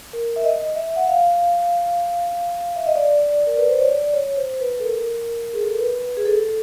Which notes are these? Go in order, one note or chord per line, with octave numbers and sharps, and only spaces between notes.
A#4
E5
D#5
E5
F#5
F5
E5
D#5
D5
A#4
B4
C5
C#5
D5
C#5
C5
B4
A4
A#4
G#4
A4
A#4
B4
G#4
A4